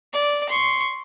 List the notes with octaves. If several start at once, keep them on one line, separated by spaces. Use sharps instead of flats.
D5
C6 C#6